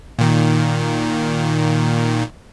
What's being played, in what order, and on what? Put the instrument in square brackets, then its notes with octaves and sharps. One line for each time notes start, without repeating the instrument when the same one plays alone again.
[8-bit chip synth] A#2 D#3